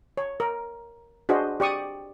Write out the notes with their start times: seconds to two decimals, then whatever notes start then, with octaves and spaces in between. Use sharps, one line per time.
0.17 C#5
0.40 A#4
1.29 D4 F#4 G#4 C5 D#5
1.60 G4 D5 C#6 D#6